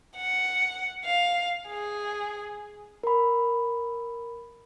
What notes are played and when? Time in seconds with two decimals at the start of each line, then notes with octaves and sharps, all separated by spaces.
0.16 F#5
1.05 F5
1.68 G#4
3.03 A#4 B5